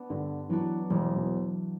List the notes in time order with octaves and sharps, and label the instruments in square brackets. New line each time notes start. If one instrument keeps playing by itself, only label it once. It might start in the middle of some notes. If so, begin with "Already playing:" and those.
Already playing: [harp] B3 D4
[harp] G2 [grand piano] D3
[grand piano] E3 [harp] F#3 B3 D4 F#4
[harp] E1 [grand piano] G3
[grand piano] B2